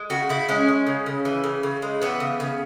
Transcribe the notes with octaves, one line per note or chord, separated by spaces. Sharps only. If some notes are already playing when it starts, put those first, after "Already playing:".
Already playing: G#3
C#3 F#4
C#3 E4
G#3 C#4
G#3
C#3
C#3
E3
C#3
C#3
G#3
E3 B3
C#3
C#3